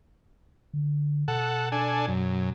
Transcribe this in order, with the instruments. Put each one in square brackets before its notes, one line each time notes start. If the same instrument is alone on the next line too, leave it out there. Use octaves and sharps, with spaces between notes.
[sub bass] D3
[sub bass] B2 [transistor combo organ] A4 F#5
[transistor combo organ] D4 A4 G#5
F#2